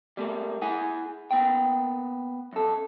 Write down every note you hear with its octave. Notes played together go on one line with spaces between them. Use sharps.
G3 A3 A#3
E4 G#4 F#5 G#5
A#3 B3 G5
F#2 A4